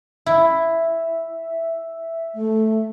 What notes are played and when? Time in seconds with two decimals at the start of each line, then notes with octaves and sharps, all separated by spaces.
0.26 E4 E5
2.34 A3